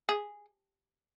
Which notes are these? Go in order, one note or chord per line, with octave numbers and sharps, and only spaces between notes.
G#4